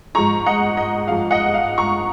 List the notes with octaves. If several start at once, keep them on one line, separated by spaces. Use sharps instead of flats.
G#2 F3 G#3 A#5 C#6
D#5 F#5
D#5
G#2 F3 G#3 F5
D#5 F#5
F5
A#5 C#6